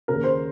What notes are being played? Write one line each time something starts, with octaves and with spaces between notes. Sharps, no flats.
D#2 C#3 A#4
C5